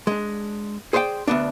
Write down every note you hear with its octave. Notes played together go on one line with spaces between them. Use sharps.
G#3 D4
G#4 C5 D5 F5 G5
D2 B3 D4